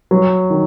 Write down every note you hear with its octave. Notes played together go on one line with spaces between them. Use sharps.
F#3
D#3